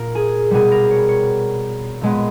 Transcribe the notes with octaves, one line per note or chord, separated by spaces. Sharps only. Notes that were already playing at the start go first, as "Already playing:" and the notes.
Already playing: A#2 A#3 A#4
G#4
B2 G3 B3 G#4
A#4
C#5
C#5
A#2 G#3 B3